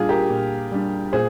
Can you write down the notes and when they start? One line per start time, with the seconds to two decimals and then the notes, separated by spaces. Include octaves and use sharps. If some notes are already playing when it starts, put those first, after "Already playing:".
Already playing: A#2 G3 D4 F4 G#4
0.09 G4 A#4
0.30 A#2
0.71 G3 D4
1.13 A#2 G#4 C5